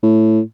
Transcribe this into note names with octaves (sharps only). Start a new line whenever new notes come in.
A2